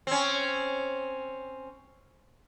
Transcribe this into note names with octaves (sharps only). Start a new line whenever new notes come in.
C4 C#4